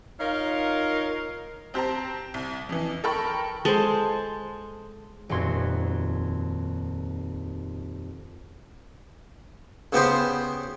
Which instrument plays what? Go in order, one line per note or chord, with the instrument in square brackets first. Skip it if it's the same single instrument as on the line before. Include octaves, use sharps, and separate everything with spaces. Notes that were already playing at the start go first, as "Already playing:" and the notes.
[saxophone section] D#4 F4 A#4 C#5 F5
[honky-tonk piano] C4 G4 C5 A5 A#5
C2
F2 E3
A4 A#4 G5 B5 C#6
[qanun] G#3 [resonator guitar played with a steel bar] A4 C5
[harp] D#1 F2 F#4 C6 G#6
[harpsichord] C#3 B3 G4 C5